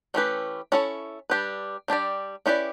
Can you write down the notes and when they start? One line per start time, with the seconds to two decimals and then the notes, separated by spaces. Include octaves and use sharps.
0.14 E3 A3 C#4 G4 B4
0.72 C#4 E4 A4 C#5
1.30 G3 D4 G4 B4
1.88 G3 D4 G4 D5
2.46 C#4 E4 G4 B4 D5